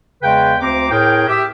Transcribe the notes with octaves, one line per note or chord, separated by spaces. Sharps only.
E2 C#3 G#3 B4 G5
D2 C4 C5 A#5 D6
A2 G#4 A#4 G5
G4 E5